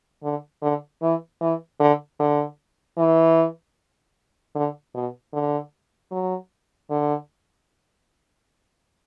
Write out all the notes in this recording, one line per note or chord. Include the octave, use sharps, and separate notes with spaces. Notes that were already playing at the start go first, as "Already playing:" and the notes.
D3
D3
E3
E3
D3
D3
E3
D3
B2
D3
F#3
D3